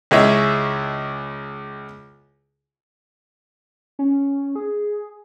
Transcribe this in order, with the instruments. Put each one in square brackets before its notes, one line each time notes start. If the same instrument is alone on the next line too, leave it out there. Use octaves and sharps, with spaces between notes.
[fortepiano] C#2 E4 G#4 C#5 D#5 E5
[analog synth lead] C#4
G#4